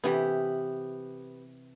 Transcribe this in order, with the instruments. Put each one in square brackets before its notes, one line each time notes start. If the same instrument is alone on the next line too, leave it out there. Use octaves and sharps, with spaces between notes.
[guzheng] C3 E3 E4 [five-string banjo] B3 G4